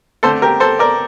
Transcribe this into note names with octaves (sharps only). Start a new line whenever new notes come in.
D3 A3 C4 A4 C5
G4 A#4
A4 C5
A#4 D5